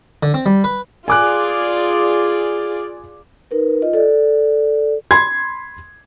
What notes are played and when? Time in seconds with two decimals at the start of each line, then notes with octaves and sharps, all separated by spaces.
0.23 D3
0.34 C4
0.46 G3
0.64 B4
1.08 F4 G#4 D5 G#5 D6 F#6
3.51 D#4 A#4 B4
3.82 F4 D#5
3.93 A4 D5
5.11 B5 C6 G#6